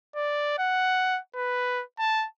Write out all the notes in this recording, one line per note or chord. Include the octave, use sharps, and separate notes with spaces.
D5
F#5
B4
A5